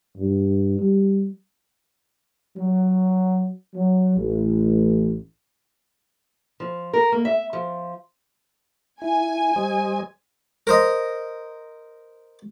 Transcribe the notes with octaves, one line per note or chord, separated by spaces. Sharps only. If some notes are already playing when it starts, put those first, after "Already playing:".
G2
G3
F#3
F#3
A1
F3
A#4
A#3
E5
F3
E4 G#5
G3 C5 D#5
A#4 C5 D#5